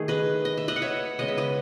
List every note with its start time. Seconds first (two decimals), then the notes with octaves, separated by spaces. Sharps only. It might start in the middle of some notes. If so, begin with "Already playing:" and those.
Already playing: D#3 A3 G#4
0.08 B4 D#5
0.45 D#5
0.57 E5
0.68 B4 D#5
0.76 F#5
0.82 C#5 E5
1.19 C#3 G#3 B3 D#5
1.28 E5
1.37 B4 D#5